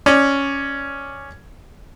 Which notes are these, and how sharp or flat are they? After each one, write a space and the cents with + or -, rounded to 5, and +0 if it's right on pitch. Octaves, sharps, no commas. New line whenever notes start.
C#4 +0 D5 +10